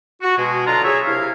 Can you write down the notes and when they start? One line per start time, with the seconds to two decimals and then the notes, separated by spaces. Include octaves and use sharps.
0.22 F#4
0.37 B2 G#3
0.66 D3 F#3 D4 F4 A#5
0.84 G#4 C#5 E5
1.06 C2 C3 E4 F5